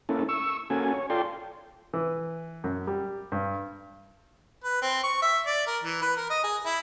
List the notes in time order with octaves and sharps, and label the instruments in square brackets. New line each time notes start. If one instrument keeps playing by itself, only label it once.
[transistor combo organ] A#3 C#4 E4 A4
C#6 E6
A#3 C#4 F#4 A4 G#5
C#5
F4 A4 D5 G5 C6
[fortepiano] E3
F#2
G3
G2
[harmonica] B4
C4
C#6
E5
D5
A#4
E3
B4
A#4
D#5
G#4
E4